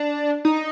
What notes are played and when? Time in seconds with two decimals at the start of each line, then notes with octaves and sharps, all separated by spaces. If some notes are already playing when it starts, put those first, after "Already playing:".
Already playing: D4
0.45 D#4